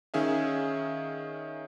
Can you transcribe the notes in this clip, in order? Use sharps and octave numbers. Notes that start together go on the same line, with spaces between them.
D#3 C#4 G#4 E5 F5